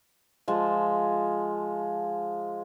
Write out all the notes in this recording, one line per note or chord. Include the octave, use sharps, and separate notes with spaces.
F3 G#3 A5